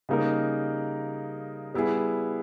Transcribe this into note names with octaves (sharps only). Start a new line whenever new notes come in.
C#3 G3 A#3 D#4 A#4
G3 B3 E4 G#4